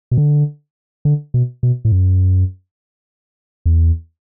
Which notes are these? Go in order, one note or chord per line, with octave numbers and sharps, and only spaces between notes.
B2
D3
D3
B2
B2
A2
F#2
E2